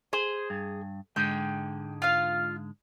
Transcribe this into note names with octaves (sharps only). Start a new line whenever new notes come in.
G#4 C5
G2
G#2 D3 G#3 G5
F4 F5